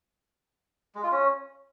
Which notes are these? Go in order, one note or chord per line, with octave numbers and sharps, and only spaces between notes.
G#3
F4
C#4